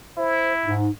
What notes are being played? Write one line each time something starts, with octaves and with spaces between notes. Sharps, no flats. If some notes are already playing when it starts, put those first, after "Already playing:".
E4 C5
G#2 D#4